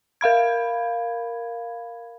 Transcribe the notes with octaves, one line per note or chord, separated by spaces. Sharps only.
A#4 F5 B5 G#6